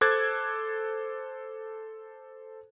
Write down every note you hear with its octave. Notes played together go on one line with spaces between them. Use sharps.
A4 C5 D6 F#6 G#6 A6